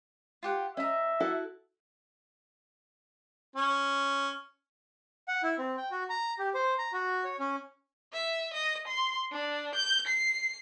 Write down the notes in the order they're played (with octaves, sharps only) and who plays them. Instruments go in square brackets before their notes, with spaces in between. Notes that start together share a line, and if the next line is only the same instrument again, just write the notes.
[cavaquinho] F4 G4 F#5
[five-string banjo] C#4 [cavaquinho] D#5 A#5 [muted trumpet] E5
[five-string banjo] E4 F#4 A4
[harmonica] C#4
[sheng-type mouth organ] F#5
E4
C4
G5
F#4
A#5
G4
C5
A#5
F#4
C#5
C#4
[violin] E5
D#5
C6
D4
G6
C7